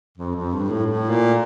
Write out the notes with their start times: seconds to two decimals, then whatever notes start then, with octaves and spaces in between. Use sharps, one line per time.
0.17 F2
0.35 F2
0.52 G2
0.69 A2
0.86 A2
1.09 A#2